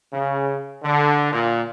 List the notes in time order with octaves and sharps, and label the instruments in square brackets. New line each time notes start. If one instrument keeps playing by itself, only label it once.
[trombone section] C#3
D3
A#2